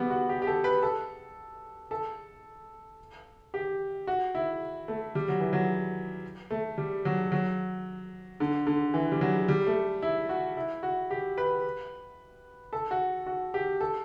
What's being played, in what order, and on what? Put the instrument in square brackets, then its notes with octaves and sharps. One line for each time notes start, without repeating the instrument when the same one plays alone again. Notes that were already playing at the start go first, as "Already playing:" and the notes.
Already playing: [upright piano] G3 B3
F#4
G4
G4
A4
B4
A4
A4
G4
F#4
E4
A3
G3
F#3
E3
F#3
A3
G3
F#3
F#3
D3
D3
E3
G3
F#3
G3
A3
E4
F#4
E4
F#4
G4
B4
A4
F#4
F#4
G4
A4